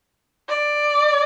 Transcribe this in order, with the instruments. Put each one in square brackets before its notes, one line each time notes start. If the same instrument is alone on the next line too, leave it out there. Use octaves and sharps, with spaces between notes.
[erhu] D5